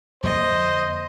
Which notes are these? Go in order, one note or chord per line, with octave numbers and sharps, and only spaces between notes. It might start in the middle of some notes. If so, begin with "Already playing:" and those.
F2 D3 A#3 C5 D#5